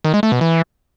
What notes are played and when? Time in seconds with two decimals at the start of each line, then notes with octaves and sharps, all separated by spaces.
0.05 D#3
0.14 G#3
0.23 A3
0.32 B2
0.41 E3